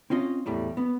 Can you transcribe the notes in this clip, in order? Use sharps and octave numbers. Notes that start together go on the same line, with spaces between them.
C4 C#4 F4 D#5
E2 A2 G3 A3
B3